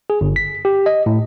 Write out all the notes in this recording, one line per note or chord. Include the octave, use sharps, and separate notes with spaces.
G#4
G1
B6
G4
D#5
A2